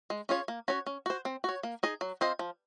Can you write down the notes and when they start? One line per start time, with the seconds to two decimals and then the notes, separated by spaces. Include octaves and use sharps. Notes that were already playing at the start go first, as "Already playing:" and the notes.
0.10 G#3
0.29 C#4 F4 G#4 C#5
0.48 A#3
0.68 C#4 F#4 C#5
0.86 C#4
1.06 F#4 C5
1.25 C4
1.44 F#4 C#5
1.63 A#3
1.83 D#4 G#4 D#5
2.01 F#3
2.21 C4 F4 C5 D#5
2.39 F3